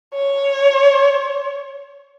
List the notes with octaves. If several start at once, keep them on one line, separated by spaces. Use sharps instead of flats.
C#5